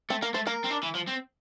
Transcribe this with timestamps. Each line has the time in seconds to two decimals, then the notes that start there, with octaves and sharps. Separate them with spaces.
0.10 A3 C4
0.22 A#3 A#4
0.34 A3 C5
0.47 A#3 A#4
0.64 C4
0.71 D4
0.83 E3
0.95 F3
1.07 C4